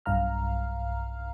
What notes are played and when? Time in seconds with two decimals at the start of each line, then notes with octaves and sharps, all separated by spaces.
0.06 B1 G2 F5 A#5 F6